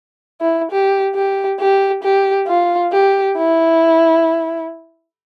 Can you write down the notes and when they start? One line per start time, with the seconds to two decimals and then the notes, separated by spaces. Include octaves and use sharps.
0.41 E4
0.71 G4
1.16 G4
1.60 G4
2.03 G4
2.48 F4
2.92 G4
3.37 E4